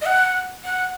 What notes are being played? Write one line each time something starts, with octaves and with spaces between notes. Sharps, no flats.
D#5
F#5
F#5